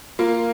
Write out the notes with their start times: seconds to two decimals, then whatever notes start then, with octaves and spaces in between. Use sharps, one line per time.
0.19 A#3 F4